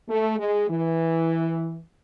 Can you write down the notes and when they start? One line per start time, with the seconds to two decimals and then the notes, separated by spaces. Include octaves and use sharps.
0.09 A3
0.39 G#3
0.70 E3